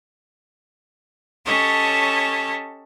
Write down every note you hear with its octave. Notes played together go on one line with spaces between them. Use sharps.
C#4 G4 A4 C#5 D#5 A5